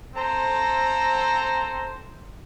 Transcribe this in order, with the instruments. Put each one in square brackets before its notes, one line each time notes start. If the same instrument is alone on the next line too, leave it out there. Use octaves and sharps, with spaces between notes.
[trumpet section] C4 A4 C5 A#5